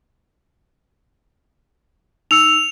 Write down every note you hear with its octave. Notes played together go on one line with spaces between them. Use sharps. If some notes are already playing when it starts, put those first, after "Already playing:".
D#4 E6 C#7 F7